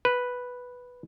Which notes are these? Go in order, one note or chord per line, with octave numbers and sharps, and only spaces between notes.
B4